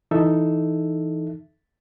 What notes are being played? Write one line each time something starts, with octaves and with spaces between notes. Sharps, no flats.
E3 D#4 A4 E5